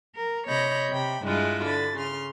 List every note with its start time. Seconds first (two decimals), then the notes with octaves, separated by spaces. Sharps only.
0.17 A#4
0.48 C3 C#5 D#5 B5 G6 A#6
0.91 C3 G5 B5
1.25 G2 G#3 E4 F4 F#6
1.65 D3 B5 A6
1.97 C#3 C6 F6